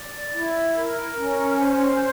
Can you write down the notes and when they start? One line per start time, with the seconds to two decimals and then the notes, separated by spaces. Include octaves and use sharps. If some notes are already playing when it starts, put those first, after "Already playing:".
Already playing: D5
0.34 E4
0.76 A#4
1.17 C#4
1.58 C5